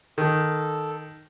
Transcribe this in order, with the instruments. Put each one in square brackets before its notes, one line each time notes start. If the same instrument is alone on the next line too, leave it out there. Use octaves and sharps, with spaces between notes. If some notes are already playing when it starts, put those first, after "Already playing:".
[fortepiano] D#3 [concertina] A4